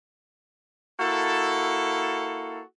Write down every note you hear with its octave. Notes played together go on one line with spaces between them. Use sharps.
A#3 E4 F#4 A4